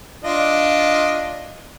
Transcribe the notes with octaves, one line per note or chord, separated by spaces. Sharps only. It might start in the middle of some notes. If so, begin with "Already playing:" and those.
D4 F4 D#5